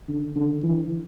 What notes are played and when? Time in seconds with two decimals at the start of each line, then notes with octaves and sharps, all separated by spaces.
0.08 D3
0.36 D3
0.64 E3